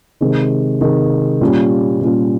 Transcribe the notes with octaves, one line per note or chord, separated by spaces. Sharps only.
C3 D#3 G#3
C3 D#3 G#3
A#2 G3 C#4 F4
A#2 G3 C#4 F4